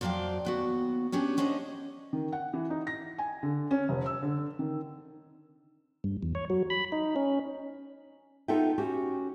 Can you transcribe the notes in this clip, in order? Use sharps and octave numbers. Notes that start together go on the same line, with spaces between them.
F2 F3 F#3 D5 F5 G5
D#2 B3 F#4
B3 C#4 D4 G4
B3 C#4 D4 C5 C#5 D#5
D#3
F#5
E3
D#4
A#6
G#5
D3
C#4
F1
E6
D3
D#3
G2
E2
C#5
F#3
B5
D#4
C#4
B3 D#4 F4 A4 E5 G5
C#4 F#4 G4